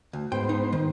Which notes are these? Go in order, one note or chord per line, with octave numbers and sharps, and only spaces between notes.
D2
G#2 B3 C5 G5
D#4
D#3